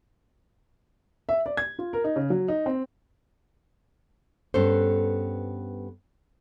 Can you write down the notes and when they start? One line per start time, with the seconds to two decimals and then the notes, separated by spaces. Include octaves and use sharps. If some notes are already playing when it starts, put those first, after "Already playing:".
1.29 E5
1.46 D5
1.57 G#6
1.79 F4
1.93 A#4
2.04 D#4
2.16 C#3
2.30 F#3
2.48 D#4
2.66 C4
4.54 G2 B3 C#4 A4 C5